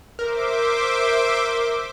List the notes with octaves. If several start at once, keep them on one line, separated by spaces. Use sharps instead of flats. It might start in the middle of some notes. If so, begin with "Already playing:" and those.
A#4 C5 E5 D6